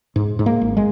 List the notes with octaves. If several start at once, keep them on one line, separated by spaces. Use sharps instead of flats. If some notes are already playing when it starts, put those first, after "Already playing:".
G#2
G#2
A#3
G#1
G#3